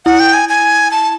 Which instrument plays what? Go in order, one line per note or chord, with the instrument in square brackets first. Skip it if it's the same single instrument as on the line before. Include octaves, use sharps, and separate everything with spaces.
[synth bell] E4 [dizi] F#5
[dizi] G5
G#5
G#5
A5